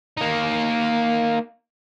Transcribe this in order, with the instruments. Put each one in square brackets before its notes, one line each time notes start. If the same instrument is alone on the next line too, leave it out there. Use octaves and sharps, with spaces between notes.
[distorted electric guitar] A#3 D#4